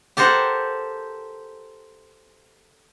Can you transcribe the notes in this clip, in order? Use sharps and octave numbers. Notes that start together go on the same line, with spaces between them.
G4 A4 A#4 C5 F#5